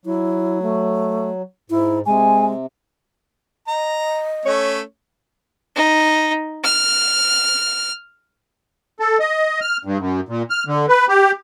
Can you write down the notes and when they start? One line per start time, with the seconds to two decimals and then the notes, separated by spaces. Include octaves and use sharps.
0.05 F#3 E4
0.62 A3
1.70 G#2 E4
2.06 C3 G#3 G#5
3.68 D#5 A#5
4.45 A3 C#4 C#5
5.76 D#4
6.64 F6
9.00 A4
9.20 D#5
9.61 F6
9.85 G2
9.99 F#2
10.29 A#2
10.50 F6
10.67 D3
10.89 B4
11.09 G4